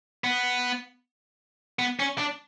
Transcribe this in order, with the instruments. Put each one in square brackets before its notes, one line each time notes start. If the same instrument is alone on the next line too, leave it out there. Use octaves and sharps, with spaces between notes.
[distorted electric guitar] B3
B3
C#4
D4